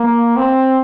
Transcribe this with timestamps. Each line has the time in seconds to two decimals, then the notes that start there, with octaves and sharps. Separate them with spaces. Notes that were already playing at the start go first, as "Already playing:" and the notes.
Already playing: A#3
0.37 C4